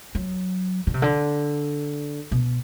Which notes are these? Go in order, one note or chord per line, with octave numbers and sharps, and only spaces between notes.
F#3
D3
C3
D3
B2